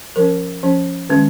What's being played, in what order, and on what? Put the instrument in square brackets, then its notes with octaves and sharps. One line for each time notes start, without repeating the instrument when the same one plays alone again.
[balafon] F3 C#4 A#4
F3 C#4
D#3 G#3 C#4